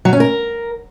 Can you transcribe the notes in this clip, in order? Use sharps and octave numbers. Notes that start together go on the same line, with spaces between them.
F#3
C#4
A#4